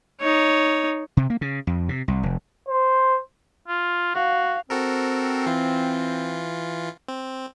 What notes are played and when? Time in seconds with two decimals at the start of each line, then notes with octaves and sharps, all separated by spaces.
0.20 D#4 C#5
1.17 C3
1.30 A#3
1.41 C#3
1.67 F2
1.89 C3
2.08 C2
2.23 F1
2.69 C5
3.68 F4
4.15 F#4 F5
4.70 C4 F#4 A4 A#4
5.46 E3 F4
7.08 C4